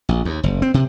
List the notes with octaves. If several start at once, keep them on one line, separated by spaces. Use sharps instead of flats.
A#1
D#2
F#1
C4
C3